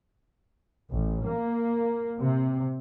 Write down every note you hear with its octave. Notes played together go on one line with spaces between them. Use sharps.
A1
A#3
C3